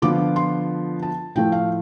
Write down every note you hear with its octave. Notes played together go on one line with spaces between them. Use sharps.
D3 F3 B3 F4 D6
C6
A5
A2 F3 A3 G5
F5